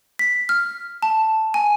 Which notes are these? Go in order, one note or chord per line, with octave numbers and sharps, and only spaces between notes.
B6
F6
A5
G#5